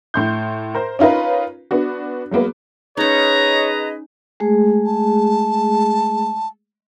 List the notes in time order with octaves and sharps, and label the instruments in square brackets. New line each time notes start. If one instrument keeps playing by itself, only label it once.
[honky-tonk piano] A2 C6 G6
A#4 C5
C#4 D#4 F4 A#4 B4
B3 D4 F#4
F#3 G#3 A#3 B3
[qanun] C#4 D#4 [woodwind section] G#4 B4 D#5 [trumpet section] C#5 [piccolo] A#5
[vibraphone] G#3 A3 G#4
[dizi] A5